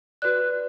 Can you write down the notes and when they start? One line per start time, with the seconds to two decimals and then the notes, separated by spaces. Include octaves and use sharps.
0.22 F#4 B4 D5 F#6